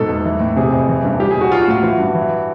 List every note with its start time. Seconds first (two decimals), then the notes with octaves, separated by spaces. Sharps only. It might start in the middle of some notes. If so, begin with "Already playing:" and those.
Already playing: G#2 B2 A4
0.08 E2
0.25 E3
0.40 A2
0.56 C3 G#4
0.72 F2
0.89 E3
1.04 G2
1.19 G3 G4
1.31 G#4
1.36 B2
1.41 F#4
1.52 F#3 F4
1.61 F#4
1.68 A2 F4
1.83 E3 F#4
1.99 G2
2.15 E3